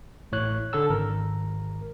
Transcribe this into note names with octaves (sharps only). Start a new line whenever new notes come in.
A1 A2 C#5 F#6
D3 A4 A5 E6
G#1 A#4